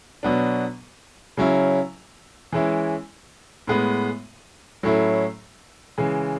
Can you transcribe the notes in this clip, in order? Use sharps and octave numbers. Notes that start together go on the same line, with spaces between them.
B2 F#3 B3 D4
C#3 F#3 C#4 E4
E3 G#3 C#4 E4
A2 G#3 B3
A2 F#3 A3 C#4 E4
C#3 E3 G#3